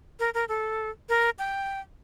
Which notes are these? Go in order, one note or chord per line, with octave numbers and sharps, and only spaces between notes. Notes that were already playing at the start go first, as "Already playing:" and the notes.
A#4
A#4
A4
A#4
G5